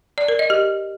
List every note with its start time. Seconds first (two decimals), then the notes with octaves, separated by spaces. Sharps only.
0.18 D5
0.28 A#4
0.39 D#5
0.50 G4